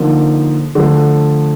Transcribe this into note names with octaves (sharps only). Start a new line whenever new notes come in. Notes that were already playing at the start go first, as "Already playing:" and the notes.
Already playing: D3 F3 A#3 D#4
D3 F3 A3